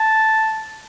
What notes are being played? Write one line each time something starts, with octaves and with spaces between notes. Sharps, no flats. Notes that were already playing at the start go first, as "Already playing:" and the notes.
Already playing: A5